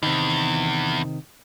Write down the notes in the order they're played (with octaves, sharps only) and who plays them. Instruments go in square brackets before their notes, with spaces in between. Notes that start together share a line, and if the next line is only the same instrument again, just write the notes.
[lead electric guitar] E2 [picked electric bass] C3 D#3